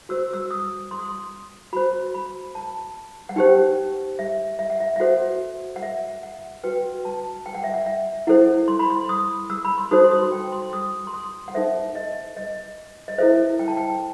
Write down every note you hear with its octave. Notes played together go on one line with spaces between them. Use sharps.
F#4 C5 E6
E6
D#6
C6
D#6
C6
F#4 C5 B5
B5
A5
F#5
D#4 G4 C5 G5
E5
E5
F#5
E5
E5
F#4 A4 C5 F#5
F#5
E5
F#5
F#4 B4 G5
A5
G5
F#5
E5
F#5
E5
E4 A4 C5 F#5
C6
B5
C6
D#6
E6
B5
C6
D#4 F#4 A4 C5 D#6
C6
D#6
G5
C6
D#6
C6
D#6
F#5
D#4 A4 C5 E5
D#5
D#5
D#5
E4 A4 C5 E5
G5
A5
G5